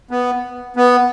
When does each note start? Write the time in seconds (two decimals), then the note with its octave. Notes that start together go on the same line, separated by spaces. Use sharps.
0.11 B3
0.76 B3